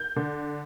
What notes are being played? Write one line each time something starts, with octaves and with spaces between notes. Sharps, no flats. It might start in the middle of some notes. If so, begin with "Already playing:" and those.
Already playing: G6
D3